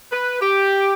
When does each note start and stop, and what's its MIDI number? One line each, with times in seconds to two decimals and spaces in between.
0.10 0.39 71
0.40 0.93 67